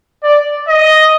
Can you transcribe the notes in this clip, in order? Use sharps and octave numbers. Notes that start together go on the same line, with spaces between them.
D5
D#5